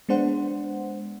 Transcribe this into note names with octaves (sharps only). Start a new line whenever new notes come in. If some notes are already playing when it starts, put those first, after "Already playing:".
G#3 B3 D4 C5 F#5